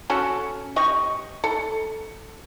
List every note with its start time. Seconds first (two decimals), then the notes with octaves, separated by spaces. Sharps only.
0.10 C#4 F#4 A4
0.76 G4 D#5 C#6
1.44 A4